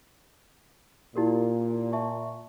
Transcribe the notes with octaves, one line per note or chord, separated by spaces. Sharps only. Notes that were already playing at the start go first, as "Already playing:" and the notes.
A#2 E4 G4 A#4
E5 A5 C#6